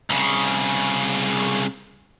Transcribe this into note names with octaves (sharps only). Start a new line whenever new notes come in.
C2 C#3